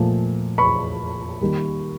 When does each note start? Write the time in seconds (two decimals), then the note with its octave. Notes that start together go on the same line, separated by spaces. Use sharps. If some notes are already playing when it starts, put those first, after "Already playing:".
Already playing: A#2 F3 A3
0.58 B5 C#6
1.41 D#3 G3 A#3